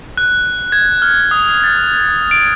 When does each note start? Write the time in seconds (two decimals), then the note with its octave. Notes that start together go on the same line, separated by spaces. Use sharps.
0.17 F#6
0.72 G#6
1.02 F6
1.31 D#6
1.64 A6
2.31 D7